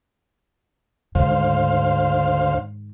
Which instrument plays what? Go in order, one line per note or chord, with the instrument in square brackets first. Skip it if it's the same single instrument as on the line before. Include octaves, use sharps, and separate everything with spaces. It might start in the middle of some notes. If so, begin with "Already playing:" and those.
[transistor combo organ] D2 C5 F5 [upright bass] G#2 D#3